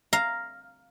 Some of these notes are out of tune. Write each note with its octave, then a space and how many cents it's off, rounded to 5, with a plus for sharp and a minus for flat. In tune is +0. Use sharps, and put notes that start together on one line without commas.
F5 +0 A#5 +0